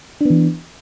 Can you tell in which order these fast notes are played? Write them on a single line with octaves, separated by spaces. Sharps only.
D4 B3 E3